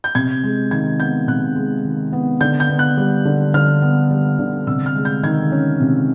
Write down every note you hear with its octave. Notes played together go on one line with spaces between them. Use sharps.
G6
C3 G#6
G#3
D#3 G#6
B3 G6
C3 F#6
G#3
D#3
B3
D3 G6
G6
B3
F#6
G3
D3
D3 F6
B3
G3
D3
C3 E6
F6
G#3
G6
D#3 G#6
C#4
C3